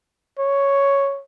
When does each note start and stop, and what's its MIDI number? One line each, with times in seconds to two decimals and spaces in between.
0.39 1.21 73